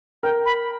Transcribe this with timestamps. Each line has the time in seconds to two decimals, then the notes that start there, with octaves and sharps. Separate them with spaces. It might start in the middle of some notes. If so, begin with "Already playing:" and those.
0.23 A#4 G5
0.45 B5